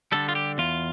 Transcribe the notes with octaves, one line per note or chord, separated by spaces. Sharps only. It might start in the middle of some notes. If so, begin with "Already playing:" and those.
D3 G3 A4
F4
G4
E2 F4